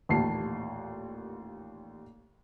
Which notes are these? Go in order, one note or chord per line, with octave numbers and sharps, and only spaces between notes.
A1 D#2 A#2 A5 C7